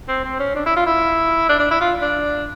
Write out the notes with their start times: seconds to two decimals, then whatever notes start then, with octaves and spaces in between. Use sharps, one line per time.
0.08 C4
0.24 C4
0.39 C#4
0.55 D4
0.66 E4
0.76 F4
0.86 E4
1.49 D4
1.59 D4
1.71 E4
1.81 F4
2.01 D4